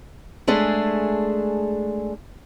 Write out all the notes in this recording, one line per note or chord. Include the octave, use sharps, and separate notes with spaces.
G#3 A3 D4 G#4